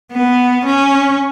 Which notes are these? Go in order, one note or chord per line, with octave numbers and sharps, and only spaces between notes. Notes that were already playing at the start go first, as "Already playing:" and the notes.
B3
C#4